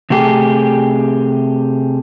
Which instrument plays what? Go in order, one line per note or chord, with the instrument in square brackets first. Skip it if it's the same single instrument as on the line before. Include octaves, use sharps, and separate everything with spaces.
[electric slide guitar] C3 A3 G4 G#4